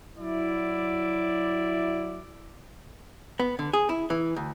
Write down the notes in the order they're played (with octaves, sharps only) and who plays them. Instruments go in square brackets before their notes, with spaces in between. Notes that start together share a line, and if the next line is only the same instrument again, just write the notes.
[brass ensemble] F#3 E4 D5
[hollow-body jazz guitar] B3
D3
G#4
E4
E3
D2